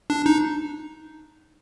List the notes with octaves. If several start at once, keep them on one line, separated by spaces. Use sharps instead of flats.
D4
D#4